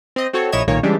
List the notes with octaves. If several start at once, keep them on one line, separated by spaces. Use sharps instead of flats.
C4 D#5
C4 F#4 A4 C#5
A#1 E4 C#5 D#5 G#6 E7
B1 A#2 D#3 A#3 C#5
C#3 E3 G3 G#3 D4